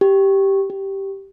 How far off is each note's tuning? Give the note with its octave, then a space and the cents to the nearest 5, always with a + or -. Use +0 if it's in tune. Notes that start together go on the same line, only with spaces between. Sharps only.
G4 -5
G4 -5